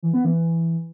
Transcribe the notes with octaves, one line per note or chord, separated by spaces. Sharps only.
E3
B3
E3